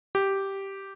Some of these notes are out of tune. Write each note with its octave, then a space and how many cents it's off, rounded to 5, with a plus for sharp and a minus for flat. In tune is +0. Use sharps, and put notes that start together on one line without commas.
G4 -5